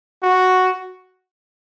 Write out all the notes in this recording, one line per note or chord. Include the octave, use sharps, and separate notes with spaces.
F#4